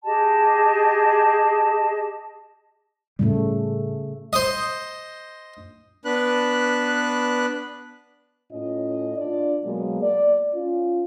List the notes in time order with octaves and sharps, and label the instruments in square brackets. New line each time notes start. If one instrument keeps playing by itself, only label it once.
[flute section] G4 G#4 D#5 A5
[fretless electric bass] A2 G3 [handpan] C#3 A3
[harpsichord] C5 D#5
[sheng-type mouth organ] B3 D4 B4 F#6
[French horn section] A2 C#4 F4 D#5
D4 F4 D5
B2 F#3 G#3 A#3
D5
C#4 F4